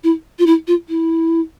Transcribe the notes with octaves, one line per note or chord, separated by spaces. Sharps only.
E4
F4
E4
F4
E4